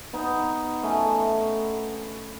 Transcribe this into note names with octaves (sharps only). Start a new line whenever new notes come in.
B3 D#4
A3 C#4